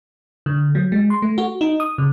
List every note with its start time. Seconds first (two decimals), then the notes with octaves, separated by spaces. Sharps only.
0.46 D3
0.75 F#3
0.92 G#3
1.10 C6
1.22 A3
1.38 F#4
1.61 D#4
1.80 D#6
1.98 C#3